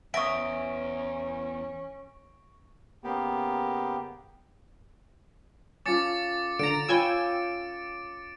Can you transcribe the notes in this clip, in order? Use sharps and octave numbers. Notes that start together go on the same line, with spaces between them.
E2 C#4 E5 C#6 D#6 A#6 D7
C#3 A#3 B3 G4
C#4 F4 A4 D6 A6 C#7
D3 A#5 D7
F4 C#5 G5 G#5 B5 E6